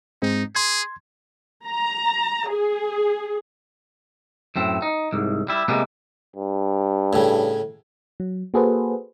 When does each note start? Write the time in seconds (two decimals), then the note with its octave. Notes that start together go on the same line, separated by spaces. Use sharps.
0.22 G#2 G#3 C4 D#4
0.55 G#4 C6 G#6
1.66 A#5
2.50 G#4
4.56 F#2 A2 C4
4.82 D#4
5.13 C2 G#2
5.48 G3 E4
5.68 C3 G3 G#3 A#3 B3
6.36 G2
7.13 A2 C#3
8.20 F#3
8.54 A#3 F#4 G#4 A4 B4 C5